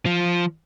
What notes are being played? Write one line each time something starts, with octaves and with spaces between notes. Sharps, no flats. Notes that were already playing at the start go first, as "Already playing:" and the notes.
F3